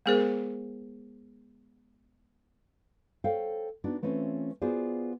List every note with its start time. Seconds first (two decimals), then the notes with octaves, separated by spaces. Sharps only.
0.06 G#3 B3 G#4 A#4 C5
3.24 A4 C5 C#5 F5 G5
3.84 B3 D4 D#4 F#4
4.02 E3 A3 C4 C#4 F4
4.62 B3 F4 F#4 G#4 C5 D5